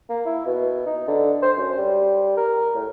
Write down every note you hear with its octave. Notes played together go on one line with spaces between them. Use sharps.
A#3
E4
B2
D#4
D3
C5
F#2
G3
A#4
A2